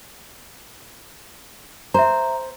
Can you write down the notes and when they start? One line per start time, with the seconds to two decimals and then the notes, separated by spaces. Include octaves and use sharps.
1.94 C5 E5 A#5